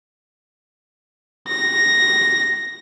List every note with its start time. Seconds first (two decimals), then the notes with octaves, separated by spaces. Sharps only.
1.48 A#6